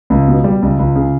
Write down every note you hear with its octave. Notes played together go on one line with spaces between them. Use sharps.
C#2
B2
G3
C#2
C#2
C#3